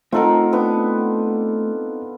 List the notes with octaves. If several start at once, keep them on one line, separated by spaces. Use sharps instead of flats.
A3 C4 D#4 F4 A4 A#4 F#5
B3 D4 G5